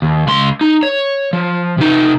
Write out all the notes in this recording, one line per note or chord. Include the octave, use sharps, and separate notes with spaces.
D#2
C#2 C6
D#4
C#5
F3
C3 D#4